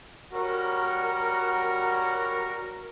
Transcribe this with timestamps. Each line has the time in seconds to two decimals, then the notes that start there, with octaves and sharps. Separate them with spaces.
0.33 G3 C#4 F#4 A#4